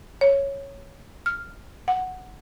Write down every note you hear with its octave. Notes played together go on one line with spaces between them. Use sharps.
C#5
F6
F#5